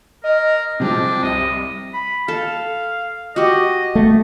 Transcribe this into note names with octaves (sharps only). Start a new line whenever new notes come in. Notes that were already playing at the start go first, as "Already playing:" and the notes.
A#4 D#5
C3 F3 G#3 C4 D4
C2 D#5
B5
A4 F5
F#4 G4 D#5
A3